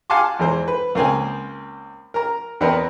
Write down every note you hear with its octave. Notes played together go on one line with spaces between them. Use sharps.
F5 F#5 G#5 A5 C6 D6
E2 E3 G#3 C5
B4
C#2 A#3 C4 G#5
A#4 A#5
E2 B3 C4 A#4 B4 D#5